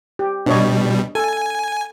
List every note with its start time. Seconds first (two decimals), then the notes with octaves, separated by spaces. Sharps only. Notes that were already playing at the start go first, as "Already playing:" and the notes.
0.19 G4
0.46 B2 G3 D4 C#5 D#5
1.15 A4 G#5